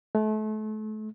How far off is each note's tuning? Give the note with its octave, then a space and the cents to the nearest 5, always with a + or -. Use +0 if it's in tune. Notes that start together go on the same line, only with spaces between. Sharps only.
A3 -35